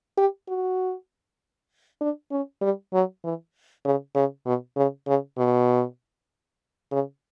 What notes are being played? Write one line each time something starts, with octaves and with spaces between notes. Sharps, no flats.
G4
F#4
D4
C#4
G3
F#3
E3
C#3
C#3
B2
C#3
C#3
B2
C#3